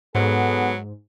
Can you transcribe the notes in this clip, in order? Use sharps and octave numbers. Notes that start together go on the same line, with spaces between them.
G#2 F#3 B3 G#4 A4